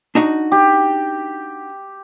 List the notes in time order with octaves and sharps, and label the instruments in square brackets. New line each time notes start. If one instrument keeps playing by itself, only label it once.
[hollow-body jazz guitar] D4 D#4 F#4
[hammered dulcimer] G4